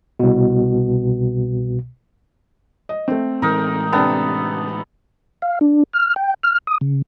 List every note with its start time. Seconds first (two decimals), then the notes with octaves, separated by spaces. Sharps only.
0.19 C2 B2
2.89 D#5
3.08 A3 C4
3.42 A2 E3 G#3 D#4 A#4
3.92 C3 B3 D4 A4 G5
5.42 F5
5.61 D4
5.93 F6
6.16 G5
6.43 F6
6.67 D#6
6.81 C#3